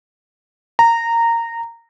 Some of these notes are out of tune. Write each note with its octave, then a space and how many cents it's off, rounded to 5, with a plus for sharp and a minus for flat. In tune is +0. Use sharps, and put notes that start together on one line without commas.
A#5 -15